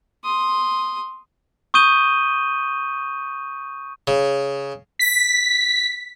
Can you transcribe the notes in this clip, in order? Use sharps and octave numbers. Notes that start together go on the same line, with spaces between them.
C6 D#6
C#6 D#6 G6 D#7 G7
C#3
B6